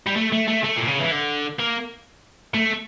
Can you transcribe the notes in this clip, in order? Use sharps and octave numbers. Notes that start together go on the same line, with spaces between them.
G3
A3
A3
A3
A3
A#2
C#3
E3
D3
A#3
A3